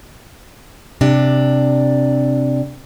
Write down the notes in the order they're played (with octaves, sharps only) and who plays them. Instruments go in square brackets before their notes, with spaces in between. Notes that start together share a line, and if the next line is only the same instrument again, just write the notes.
[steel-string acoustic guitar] C3 D4